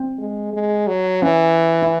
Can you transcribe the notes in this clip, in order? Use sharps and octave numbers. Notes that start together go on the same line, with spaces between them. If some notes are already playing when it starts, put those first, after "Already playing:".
Already playing: C4
G#3
G#3
F#3
E3 C#4
E4